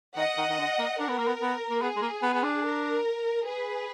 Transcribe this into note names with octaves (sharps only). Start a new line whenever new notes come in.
D#3 D#5 F#5
D#3
D#3
D3
A#3
D4 A#4
B3
A#3
B3
B3
A#3
B3 G#4
G#3
A#3
B3
B3
D4
A#4
G#4 B4